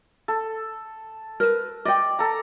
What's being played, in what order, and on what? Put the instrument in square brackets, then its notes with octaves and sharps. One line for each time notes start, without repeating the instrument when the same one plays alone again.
[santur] A4
[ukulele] A#4 B4
[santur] D5 [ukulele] D#5 G5
[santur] A4 A#5